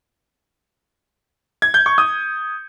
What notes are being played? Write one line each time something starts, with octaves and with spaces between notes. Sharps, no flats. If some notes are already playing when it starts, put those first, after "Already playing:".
G#6
G6
C#6
D#6